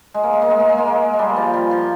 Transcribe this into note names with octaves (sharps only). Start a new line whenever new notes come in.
G#3
A#3
G#3
A#3
G#3
A#3
G#3
A#3
G#3
G#3
G3
F3
G3
F3